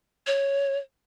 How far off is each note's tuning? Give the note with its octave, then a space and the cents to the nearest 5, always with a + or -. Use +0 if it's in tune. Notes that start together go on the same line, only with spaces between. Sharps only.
C#5 -5